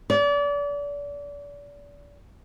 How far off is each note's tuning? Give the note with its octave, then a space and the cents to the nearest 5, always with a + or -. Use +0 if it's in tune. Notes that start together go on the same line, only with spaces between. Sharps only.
D5 -35